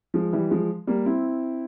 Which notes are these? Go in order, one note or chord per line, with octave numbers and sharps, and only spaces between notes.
F3 G#3
E3 G3
F3 G#3
G3 A#3
C4 E4